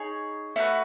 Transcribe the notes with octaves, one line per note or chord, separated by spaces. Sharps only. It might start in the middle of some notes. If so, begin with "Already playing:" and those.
Already playing: D#4 G#4 C#5
A3 C#4 F#4 B4 E5